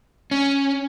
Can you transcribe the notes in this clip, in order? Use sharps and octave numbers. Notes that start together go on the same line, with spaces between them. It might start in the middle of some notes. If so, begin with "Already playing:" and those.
C#4